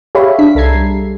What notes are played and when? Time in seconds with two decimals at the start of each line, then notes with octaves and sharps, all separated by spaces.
0.15 G4 G#4 C#5 E5 F5 B5
0.39 D4 B6
0.55 C2 A4 A#5 G#6 C7
0.75 G3